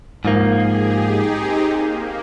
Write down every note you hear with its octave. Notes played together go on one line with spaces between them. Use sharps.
G#2 F3 A#3 G#4
G4
D#4
C4
A#3